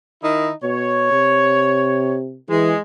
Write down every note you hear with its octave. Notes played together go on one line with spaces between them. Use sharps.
D#3 D#4 E4
B2 C#5
C3
E3 G#3